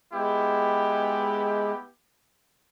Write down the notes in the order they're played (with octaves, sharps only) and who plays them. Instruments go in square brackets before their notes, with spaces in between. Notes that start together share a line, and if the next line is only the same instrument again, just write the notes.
[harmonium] G#3 [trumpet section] B3 E4 G4